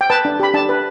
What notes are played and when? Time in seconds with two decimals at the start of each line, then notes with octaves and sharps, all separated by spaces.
0.01 G5
0.10 B4 A5
0.25 D4
0.40 G4 B5
0.54 D4 A5
0.69 B4